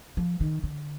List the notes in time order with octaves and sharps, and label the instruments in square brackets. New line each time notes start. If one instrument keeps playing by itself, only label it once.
[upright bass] F3
D#3
D3